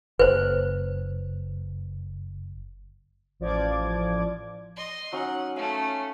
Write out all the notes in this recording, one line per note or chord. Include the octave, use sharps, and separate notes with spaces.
F#1 B4 C5
A1 F3 D5 D6 G#6
D#5 C6
F#3 C#4 D#4 F#5
A3 C#4 F5